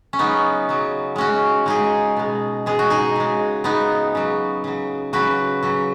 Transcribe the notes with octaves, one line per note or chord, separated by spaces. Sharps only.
C#4
C#3 F#3 B3 D#4
C#3 F#3
C#3 G#3 C#4 F#4
C#3 G#3 D#4 G#4
B2 G#3
B2 G#3 G#4
F#4
D#4 G#4
C#3 G#3
C#3 G#3 B3 D#4
C#3 F#3
C#3 F#3
C#3 F#3 F#4 B4
C#3 F#3